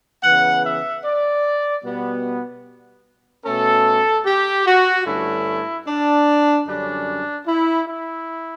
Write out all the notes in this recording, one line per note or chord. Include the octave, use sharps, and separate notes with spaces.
C#3 E3 B3 F#5
E5
D5
B2 G3 B3
B2 A3 C#4 A4
G4
F#4
G2 D3 A3 C#4 E4
D4
F#2 D3 G3 C#4 D4
E4
E4